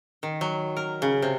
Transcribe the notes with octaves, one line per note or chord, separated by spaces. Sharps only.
D#3
F#3
A#4
C#3
C3